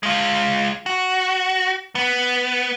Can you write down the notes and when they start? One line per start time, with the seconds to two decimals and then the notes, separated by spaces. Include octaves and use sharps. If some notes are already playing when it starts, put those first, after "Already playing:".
0.03 G#3 F4
0.86 F#4
1.95 B3